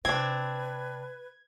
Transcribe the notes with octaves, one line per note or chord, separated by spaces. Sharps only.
C3 C4 D4 B4 G#6